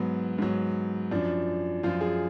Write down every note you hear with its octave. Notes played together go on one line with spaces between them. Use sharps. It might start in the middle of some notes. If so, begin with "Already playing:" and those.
Already playing: G#2 F#3 B3
G#2 F#3
F#2 F3 D4
F#2 F3 F4
G#4